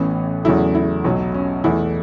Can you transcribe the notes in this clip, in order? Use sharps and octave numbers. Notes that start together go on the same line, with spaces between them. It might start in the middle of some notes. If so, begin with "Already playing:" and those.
Already playing: A1 A2 E3 B3 C#4
E2 C#3 F#3 A3 E4
E4
B1 B2 F#3
C#4
E2 E3 A3 E4